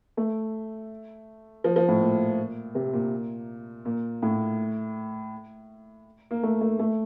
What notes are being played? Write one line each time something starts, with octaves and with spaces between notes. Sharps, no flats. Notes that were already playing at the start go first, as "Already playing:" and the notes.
A3
F3
F3
A2
A#2
C3
A#2
A#2
A2
A#3
A3
A3
A3